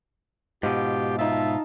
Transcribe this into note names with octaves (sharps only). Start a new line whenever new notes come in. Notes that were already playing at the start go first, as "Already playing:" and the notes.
G#2 B2 F4 G4
D#4 F4 E5 A5